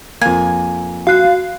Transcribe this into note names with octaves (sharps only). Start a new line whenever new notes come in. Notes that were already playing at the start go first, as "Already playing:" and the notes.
F2 A#3 G#5
F#4 F5 F#6